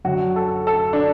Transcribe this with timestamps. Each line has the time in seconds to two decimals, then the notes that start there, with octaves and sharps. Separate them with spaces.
0.05 F#2 D3 F#3 F#4
0.36 A4
0.67 A4
0.93 D4